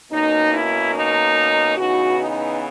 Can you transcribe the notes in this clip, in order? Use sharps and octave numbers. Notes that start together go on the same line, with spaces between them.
B2 A#3 C#4 D#4
E4
D#4
C#3 E3 B3 D#4 F#4
D#4